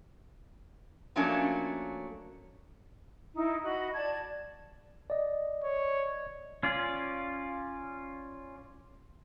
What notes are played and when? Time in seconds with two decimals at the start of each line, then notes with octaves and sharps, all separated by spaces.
1.16 F3 F#3 A3 A#3 C#4 D4
3.34 D#4 E4
3.63 F#4 D#5 B5
3.94 D5 A5 G#6
5.10 D5 D#5
5.64 C#5
6.63 C#4 F4 D5